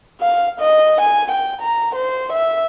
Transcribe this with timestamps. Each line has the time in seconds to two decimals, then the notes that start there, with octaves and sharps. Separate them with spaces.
0.21 F5
0.60 D#5
1.01 G#5
1.31 G5
1.61 A#5
1.95 C5
2.32 E5